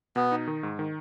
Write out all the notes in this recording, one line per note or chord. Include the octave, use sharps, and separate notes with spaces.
B2 B3
D#4
D#3
G#2
D#3